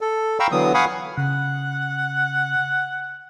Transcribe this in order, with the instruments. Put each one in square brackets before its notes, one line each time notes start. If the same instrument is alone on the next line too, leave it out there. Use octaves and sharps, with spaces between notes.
[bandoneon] A4
F5 G5 A#5 B5 C#6 E6
D3 E3 F#3 B3 D#6
F5 F#5 G#5 B5 C#6 D#6
[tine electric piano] C#3 [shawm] F#5